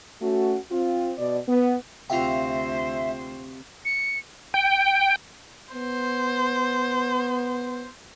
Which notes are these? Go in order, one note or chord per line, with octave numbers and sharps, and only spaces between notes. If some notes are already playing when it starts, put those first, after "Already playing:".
A3 C#4 F#4
C4 F4
B2 D5
B3
D2 C3 F4 F#4 C5 E5 F5 G5
C#7
G5
B3 C5